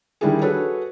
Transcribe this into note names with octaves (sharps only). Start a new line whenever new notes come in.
D#3 G3 D4 E4 G4 G#4
F#4 G#4 A4 B4 C#5